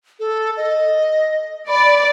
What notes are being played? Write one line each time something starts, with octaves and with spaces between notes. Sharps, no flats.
A4
D#5
D5 B5